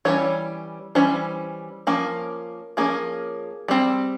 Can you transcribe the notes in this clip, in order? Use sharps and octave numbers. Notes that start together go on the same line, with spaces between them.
E3 G3 C#4 C#5
E3 G3 C#4 C5
F3 A#3 C#4
F3 A#3 C#4 G#4
G3 C4